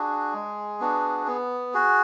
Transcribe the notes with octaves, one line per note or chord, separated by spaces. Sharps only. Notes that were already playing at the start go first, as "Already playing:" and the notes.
Already playing: D4 F#4 G#4
G#3
B3 D4 F#4
B3
F#4 G#4